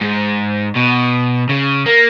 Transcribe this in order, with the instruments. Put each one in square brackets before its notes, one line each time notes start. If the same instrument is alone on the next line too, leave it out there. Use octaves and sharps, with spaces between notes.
[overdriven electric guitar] G#2
B2
C#3
A#3